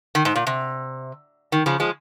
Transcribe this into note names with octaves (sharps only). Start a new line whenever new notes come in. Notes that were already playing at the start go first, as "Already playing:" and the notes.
D#3
G#2
A#2
C3
D#3
C#3 F3
F3 G#3